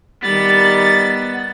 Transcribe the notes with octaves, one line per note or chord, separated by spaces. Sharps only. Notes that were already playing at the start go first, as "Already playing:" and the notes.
D#3 G3 B3 A6